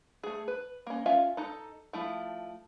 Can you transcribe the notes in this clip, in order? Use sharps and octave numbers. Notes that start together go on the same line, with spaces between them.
A3 G#4
B4
A#3 C#4
C#4 F4 E5 F5
D#4 A4
F3 A3 E4